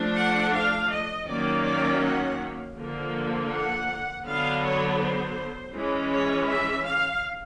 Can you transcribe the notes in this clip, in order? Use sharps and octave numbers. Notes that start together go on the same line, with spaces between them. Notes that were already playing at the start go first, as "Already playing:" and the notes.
Already playing: F3 A3 D4
F#5
F5
D#5
D#3 F#3 A#3 C#4 D5
D5
F#5
D3 F3 A#3
F#5
D3 F#3 B3 D4 F5
C#5
C5
E3 G#3 C#4
C#5
E5
F5